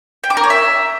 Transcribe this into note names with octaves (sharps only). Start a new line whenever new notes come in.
G5
D6
A#4
C#5
E5